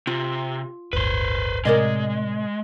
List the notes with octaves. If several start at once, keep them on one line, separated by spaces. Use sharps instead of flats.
C3 F4
D1 G1 B4 C5
A2 C3 G#3 A#4 D5 D#5